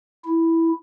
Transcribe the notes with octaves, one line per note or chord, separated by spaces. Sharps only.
E4